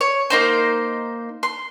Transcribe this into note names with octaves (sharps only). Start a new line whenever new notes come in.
C#5
A#3 D#4 C5
C6